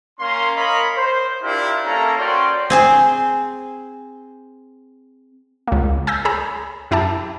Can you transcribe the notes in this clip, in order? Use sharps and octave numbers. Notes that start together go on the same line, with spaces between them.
A#3 C#4 A#5 C6
A#4 C#5 D#5 F5 A#5 B5
C5
D4 E4 F4 G4 A#4
A#3 C#4 E4 A4 A#5
C#4 F#4 C5 D5 G5 C6
C4 G#4 C5
C#2 A#3
G#5 E6 G6 A6 A#6
G#4 C#5 A#5 B5 E6
F#2 E4 G4 E5 A5